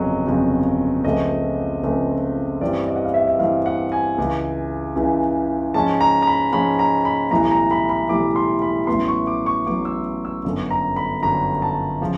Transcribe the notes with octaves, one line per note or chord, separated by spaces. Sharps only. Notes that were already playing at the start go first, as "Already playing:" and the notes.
Already playing: G1 F2 C#3 F#3 D#5
G1 F2 C#3 F#3
C#2 C#3 F3 A3 C4 D#5
C#2 C#3 F3 A3 C4
G2 E3 G3 C4 D5
D#5
F#5
F5
E5
E5
G2 E3 G3 C4 F5
F#5
G#5
C#2 C#3 E3
C#2 C#3 E3
G#2 F3 G#3 C#4 A5
A#5
A#5
B5
G#2 F3 G#3 C#4 B5
A#5
B5
B1 A2 E3 G3 A#5
A#5
B5
B5
B1 A2 E3 G3 D6
C6
B5
A1 A2 F#3 B3 C6
C#6
D6
C#6
A1 A2 F#3 B3 D6
E6
E6
G1 F#2 D3 F#3
A#5
B5
G1 F#2 D3 F#3 A#5
A5
C#3 F3